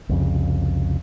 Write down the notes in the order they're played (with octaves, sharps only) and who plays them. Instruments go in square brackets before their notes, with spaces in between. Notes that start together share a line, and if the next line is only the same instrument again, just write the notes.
[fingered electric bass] C2 F2 C#3